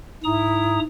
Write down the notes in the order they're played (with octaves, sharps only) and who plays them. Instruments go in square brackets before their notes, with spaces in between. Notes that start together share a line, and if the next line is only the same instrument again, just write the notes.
[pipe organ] G#2 A#5 D#6 [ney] E4